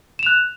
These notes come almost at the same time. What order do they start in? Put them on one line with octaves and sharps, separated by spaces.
E7 F7 F#6